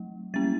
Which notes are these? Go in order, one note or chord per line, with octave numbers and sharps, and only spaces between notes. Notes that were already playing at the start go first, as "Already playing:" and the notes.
Already playing: F#3 A3
G3 A#3 C#4 A6